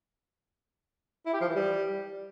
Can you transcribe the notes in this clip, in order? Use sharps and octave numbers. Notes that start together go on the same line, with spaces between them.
E4
G4
F3
E3
G3